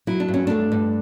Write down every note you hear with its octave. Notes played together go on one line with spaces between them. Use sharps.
F#3 E4
D4
G2
C#4
A3 D4
G2